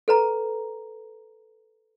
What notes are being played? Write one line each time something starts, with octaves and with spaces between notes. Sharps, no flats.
A4 B4 A#5